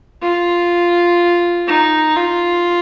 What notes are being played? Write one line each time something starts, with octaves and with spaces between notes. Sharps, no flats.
F4
D#4
F4